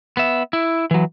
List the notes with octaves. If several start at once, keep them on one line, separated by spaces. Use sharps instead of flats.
B3 E5
E4
E3 F#3